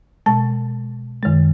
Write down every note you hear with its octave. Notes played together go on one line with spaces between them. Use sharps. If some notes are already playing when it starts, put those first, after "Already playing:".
B2 G#3 A5
F#2 D#3 G#3